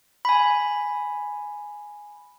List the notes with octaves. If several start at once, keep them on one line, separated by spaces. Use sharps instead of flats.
G#5 B5